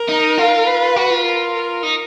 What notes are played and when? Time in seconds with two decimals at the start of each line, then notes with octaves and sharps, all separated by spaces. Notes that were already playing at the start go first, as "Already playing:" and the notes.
Already playing: A#4
0.09 D#4
0.38 F4
0.67 B4
0.96 F#4
1.10 F4
1.25 A#4
1.83 D#4